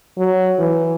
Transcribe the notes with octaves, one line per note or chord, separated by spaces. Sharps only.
F#3
E3